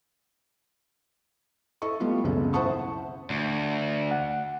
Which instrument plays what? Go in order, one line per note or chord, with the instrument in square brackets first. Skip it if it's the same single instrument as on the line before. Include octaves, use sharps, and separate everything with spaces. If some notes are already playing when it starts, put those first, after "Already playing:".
[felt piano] E4 A4 D#5 C#6
G3 A3 B3 F4
G#1 C#2 F#2 B2 C#4 A4
E4 C5 F#5 A5 C#6 D#6
[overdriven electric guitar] D2
[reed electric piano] F#5